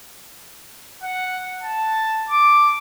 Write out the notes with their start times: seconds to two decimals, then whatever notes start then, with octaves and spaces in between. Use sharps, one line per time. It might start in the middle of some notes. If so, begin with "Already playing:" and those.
1.03 F#5
1.62 A5
2.29 D6